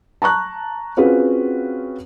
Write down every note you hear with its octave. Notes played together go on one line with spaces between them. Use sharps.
A5 A#5 C#6 F#6
C4 C#4 F4 F#4 G#4 B4